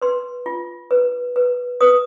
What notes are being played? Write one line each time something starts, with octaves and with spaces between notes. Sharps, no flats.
B4 C6
F4
B4
B4
B4 D#6